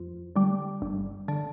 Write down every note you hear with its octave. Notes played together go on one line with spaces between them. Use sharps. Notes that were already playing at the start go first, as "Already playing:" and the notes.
Already playing: F2
D3 G3
G1
D3